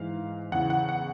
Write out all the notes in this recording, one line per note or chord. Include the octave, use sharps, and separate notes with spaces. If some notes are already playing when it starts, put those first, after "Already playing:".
Already playing: G#2 E3 F5
E2 C#3 E3 F#5
F#5
F#5